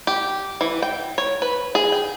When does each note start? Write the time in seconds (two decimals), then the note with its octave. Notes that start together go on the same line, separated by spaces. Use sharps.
0.07 G4
0.61 E3
0.82 G5
1.18 C#5
1.42 B4
1.75 G#4
1.92 G5